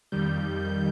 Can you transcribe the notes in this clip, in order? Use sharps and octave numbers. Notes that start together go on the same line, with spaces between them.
F2 D#3 G3 G6